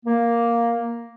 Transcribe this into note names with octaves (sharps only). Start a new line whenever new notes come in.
A#3